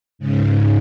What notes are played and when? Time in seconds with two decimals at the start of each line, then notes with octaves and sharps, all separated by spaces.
0.19 G#2 C#3